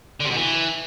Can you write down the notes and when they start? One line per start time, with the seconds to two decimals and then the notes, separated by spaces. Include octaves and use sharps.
0.20 D3
0.25 C3
0.30 B2
0.36 E3